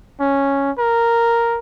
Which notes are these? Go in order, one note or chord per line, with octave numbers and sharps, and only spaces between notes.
C#4
A#4